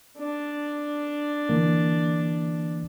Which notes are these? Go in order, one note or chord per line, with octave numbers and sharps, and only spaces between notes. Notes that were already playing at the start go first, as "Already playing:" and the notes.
D4
D3 E3 A#3